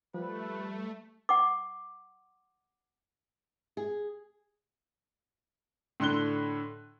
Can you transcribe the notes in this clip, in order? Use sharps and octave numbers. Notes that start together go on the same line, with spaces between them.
F3 G3 A3 B4
F#5 D6
G#4
A2 D3 C6 F#6 G7